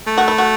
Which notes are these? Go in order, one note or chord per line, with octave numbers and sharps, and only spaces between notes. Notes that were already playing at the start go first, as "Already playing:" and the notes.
A3
F#4
E4
F#4